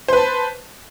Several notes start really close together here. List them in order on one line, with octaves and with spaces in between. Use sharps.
C5 B4 A5